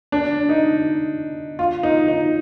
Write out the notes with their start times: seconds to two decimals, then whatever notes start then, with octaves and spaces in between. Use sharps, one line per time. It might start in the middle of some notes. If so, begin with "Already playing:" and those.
0.12 D4
0.49 D#4
1.59 F4
1.83 D#4
2.08 D#4